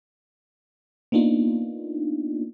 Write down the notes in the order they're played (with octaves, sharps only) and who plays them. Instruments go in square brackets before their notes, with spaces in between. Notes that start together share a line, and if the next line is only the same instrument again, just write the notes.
[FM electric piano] A#3 B3 D4 D#4 F4